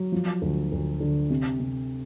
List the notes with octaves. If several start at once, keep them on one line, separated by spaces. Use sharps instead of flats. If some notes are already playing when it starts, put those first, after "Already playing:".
Already playing: F#3
F3
D2
D2
D3
C3
C3